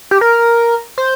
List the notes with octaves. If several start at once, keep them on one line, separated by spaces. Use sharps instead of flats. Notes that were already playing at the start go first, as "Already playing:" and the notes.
G4
A#4
C5